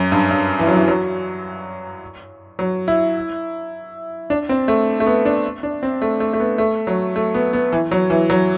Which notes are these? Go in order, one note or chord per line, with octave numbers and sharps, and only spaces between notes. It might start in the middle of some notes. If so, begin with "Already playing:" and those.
Already playing: F#2
G2
G2
E3
F#3
E3
F#3
F#3
E4
D4
C4
A3
A3
B3
D4
D4
C4
A3
A3
A3
B3
A3
F#3
A3
B3
B3
E3
F#3
E3
F#3